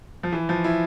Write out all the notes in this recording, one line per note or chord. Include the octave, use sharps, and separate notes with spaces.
F3
E3
F3
E4